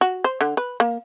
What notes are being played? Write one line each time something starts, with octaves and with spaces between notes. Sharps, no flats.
F#4
C5
D3
B4
A#3